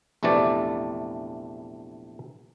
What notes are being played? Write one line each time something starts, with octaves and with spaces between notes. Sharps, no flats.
A#1 E2 C3 E3 A3 D5